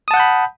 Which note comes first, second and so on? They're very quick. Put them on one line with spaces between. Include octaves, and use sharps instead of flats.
D#6 A5 F#5 G6 B5